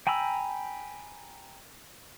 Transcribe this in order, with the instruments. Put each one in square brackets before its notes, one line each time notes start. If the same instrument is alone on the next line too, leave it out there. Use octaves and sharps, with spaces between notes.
[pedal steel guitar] G5 G#5 A#5 B5 E6